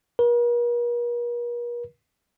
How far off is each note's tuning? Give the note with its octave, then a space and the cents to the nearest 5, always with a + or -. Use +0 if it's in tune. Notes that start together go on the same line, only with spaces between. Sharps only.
A#4 +45